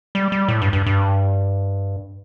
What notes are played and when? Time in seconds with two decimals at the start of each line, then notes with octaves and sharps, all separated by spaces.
0.15 G3
0.32 G3
0.48 A2
0.62 G2
0.73 G2
0.86 G2